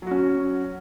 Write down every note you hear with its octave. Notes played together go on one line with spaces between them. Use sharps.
F#3 C#4 F#4